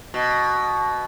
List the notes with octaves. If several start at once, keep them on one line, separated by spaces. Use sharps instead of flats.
B2